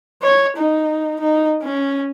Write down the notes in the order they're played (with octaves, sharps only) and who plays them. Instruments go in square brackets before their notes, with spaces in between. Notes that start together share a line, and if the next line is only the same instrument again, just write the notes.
[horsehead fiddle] C#5
D#4
D#4
C#4